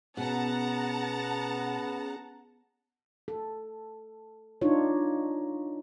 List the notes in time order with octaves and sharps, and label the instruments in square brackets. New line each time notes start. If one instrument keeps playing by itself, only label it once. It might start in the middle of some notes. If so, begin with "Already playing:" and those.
[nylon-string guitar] B2 [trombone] B3 [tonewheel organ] C#4 G#4 [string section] F#5 A5 A#5
[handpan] A4
D4 D#4 F4 C#5